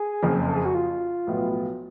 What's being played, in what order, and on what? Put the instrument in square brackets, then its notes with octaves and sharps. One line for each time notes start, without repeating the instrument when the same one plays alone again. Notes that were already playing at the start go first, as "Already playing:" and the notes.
Already playing: [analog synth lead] G#4
[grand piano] F#1 F2 C#3 F3
[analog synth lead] A4
G#4
F#4
F4
[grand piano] B1 A2 F3 B3